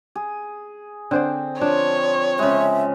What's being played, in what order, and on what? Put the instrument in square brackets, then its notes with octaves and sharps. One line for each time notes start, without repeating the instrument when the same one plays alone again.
[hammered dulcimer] G#4
[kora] D3 C5 D5 [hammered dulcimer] C4
[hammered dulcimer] F3 [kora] D4 [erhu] C#5
[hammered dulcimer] C#3 G#3 [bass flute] E5